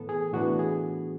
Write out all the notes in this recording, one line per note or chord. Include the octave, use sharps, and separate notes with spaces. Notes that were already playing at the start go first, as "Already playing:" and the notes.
Already playing: A2 E3 B3 A4
G#4
A2 E3 B3 D4 F#4
G#4